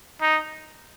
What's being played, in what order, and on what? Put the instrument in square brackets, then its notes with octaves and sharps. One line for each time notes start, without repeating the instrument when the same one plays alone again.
[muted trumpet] D#4